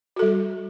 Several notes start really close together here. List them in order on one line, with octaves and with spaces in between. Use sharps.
F#4 A4 G3